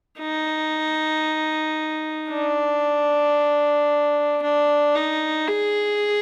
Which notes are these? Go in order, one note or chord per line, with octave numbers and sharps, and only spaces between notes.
D#4
D4
D4
D#4
G#4